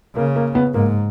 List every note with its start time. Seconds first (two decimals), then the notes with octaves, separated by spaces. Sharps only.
0.16 C#3 A#3
0.36 A#3
0.55 B3
0.74 G#2 A#3